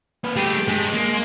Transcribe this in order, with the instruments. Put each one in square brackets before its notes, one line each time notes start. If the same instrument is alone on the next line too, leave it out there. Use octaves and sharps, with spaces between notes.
[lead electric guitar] A#3 B4
[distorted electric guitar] A3 G#4 [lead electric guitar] G4
[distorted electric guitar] G2 [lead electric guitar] G#3
[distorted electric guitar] A#3